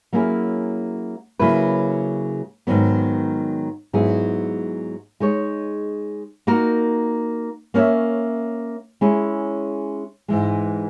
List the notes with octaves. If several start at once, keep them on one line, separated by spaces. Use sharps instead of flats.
F#3 A#3 C#4 E4 G#4
C#3 F#3 A#3 E4 B4
G#2 D#3 F#3 B3
G#2 F#3 B3 E4 G#4
G#3 D#4 G#4 C#5
A#3 D#4 F#4 A#4
A#3 C#4 F#4 C#5 E5
G#3 C#4 E4 G#4 C#5
G#2 E3 G#3